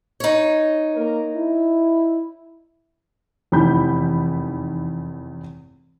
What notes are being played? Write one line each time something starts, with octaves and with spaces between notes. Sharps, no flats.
D#4 C#5
A#3 A#4
E4
F1 E2 D#3 B5 G6